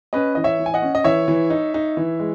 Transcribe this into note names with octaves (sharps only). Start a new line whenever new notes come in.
C#4 B4 D#5
E3 D#5
C#5 E5
E3
G#5
D#5 F#5
C#4
D#5
E3 C#5 E5
E3
D#4
D#4
E3
G#3